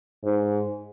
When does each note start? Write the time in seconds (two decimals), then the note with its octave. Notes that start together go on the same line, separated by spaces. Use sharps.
0.24 G#2